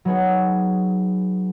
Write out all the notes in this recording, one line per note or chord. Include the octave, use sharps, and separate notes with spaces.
F#3 B3 D#4 G#4 C#5